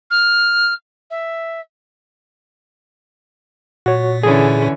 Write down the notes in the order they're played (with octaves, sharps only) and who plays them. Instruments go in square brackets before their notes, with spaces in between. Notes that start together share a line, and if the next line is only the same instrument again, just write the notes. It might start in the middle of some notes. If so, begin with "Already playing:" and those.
[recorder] F6
E5
[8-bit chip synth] A#2 [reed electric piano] F#4 C#5
[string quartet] D3 E3 C#4 [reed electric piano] G#4